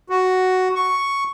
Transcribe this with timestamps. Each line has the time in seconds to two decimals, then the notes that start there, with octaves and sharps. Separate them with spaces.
0.09 F#4
0.75 C#6